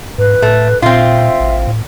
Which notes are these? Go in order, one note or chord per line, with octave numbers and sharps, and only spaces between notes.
G#2 B4
A2 A3
A#2 C4 F4 E5
A1
A2